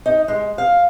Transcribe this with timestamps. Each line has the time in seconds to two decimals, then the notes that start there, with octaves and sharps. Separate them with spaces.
0.06 D#4
0.28 G#3
0.58 F5